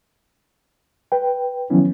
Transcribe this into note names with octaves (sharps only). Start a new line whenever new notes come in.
B4 G5
D#3 F3 F#3 B3 C#4 E4